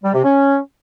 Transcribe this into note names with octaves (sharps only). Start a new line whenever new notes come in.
G3
C3
C#4